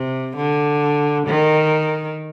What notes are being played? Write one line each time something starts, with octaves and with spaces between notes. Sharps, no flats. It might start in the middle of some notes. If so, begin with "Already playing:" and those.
Already playing: C3
D3
D#3